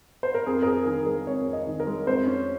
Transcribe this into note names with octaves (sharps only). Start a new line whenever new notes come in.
C5
A#4
F2 G#4
A#4
C4 G#4
D#3 G#4
G#3 A#4
F2 C#5
C4
D#5
D#3
A#4
G#3
F2 C5
C#4